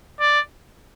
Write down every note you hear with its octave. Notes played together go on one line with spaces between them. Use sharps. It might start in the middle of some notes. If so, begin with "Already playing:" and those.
D5